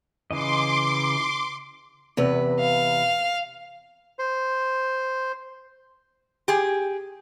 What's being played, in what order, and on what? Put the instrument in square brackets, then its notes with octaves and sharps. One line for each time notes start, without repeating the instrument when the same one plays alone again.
[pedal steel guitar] C#3 E3 D#5 [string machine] C6 D6
[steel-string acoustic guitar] E2 C3 B4
[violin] F5
[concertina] C5
[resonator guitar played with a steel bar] G4 G#4